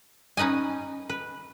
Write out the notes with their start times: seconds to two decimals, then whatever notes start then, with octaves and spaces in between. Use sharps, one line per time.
0.37 C#4 D#4 B4 D#5 G#5
1.09 B4